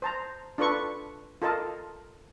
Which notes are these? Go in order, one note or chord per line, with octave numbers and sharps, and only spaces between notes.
C5 A5 A#5
D4 F4 A4 B4 C#6
F4 A4 A#4 D#5 A5